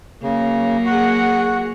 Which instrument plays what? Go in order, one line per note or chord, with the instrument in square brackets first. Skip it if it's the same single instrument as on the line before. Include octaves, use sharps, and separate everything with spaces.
[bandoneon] C#3 [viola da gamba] F#3 A#3
[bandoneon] F#4 [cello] G#4 F#5